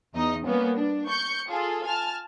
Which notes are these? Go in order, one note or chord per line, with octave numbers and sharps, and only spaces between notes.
E2 D#4 D#5
G3 A#3 B3 C#4
D4
C#6 G6 C#7
F4 G#4 A4
G#5 A5 F6